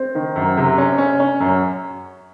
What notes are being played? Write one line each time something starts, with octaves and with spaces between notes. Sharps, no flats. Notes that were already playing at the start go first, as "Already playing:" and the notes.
Already playing: C4
D#3
F#2
C3
C#4
C#4
C#4
F#2